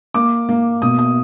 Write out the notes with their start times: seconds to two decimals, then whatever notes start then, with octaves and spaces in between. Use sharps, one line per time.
0.14 A#3 D6
0.49 A#3
0.82 B2 D#6
0.99 D#6